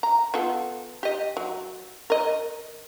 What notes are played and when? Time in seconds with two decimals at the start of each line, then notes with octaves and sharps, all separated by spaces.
0.03 A#5
0.34 B3 F4 A4
1.03 G4 D#5
1.37 F#3
2.10 A#4 D#5